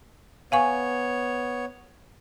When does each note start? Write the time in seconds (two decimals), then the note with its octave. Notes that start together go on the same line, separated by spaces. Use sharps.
0.52 B3 C#5 F5 G#5 C#6